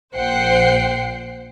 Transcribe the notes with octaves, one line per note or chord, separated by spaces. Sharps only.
A#1 A#2 C5 F#5 G5 C7